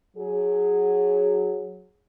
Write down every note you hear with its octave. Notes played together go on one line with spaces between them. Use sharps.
F#3 G#4